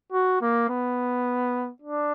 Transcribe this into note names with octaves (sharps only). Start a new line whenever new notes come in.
F#4
A#3
B3
D4